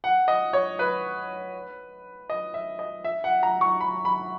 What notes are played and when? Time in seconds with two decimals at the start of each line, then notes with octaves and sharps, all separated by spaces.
0.04 F#5
0.28 D#5
0.53 C#5
0.79 B4
2.30 D#5
2.54 E5
2.79 D#5
3.04 E5
3.24 F#5
3.43 A#5
3.61 C#6
3.81 B5
4.05 B5